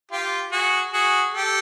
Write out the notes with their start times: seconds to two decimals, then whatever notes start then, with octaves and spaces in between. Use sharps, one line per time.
0.11 F4 G4
0.52 F#4 G#4
0.93 F#4 G#4
1.34 G4 A4